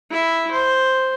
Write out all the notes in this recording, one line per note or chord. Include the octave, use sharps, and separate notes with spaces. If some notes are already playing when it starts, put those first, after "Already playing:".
E4 E5
C5